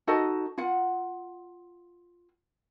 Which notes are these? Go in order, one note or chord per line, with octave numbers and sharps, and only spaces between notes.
D#4 F#4 A4 D#5
F4 F#5